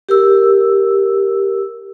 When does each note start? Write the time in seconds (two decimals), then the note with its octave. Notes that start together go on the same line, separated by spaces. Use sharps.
0.09 G4 A#4 E6